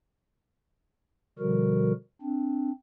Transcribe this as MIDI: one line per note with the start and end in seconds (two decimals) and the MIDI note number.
1.39 1.92 47
1.39 1.92 50
1.39 1.92 53
1.39 1.92 55
1.39 1.92 66
1.39 1.92 70
2.22 2.71 60
2.22 2.71 62